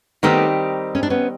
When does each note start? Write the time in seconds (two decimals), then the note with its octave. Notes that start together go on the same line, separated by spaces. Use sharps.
0.23 D#3 G3 A3 B3 C4 D#4 G4
0.95 C#4
1.03 D4
1.10 B3 C#4